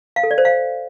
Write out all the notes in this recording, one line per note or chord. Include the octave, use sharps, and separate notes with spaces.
F5
A4
D5
C5
F5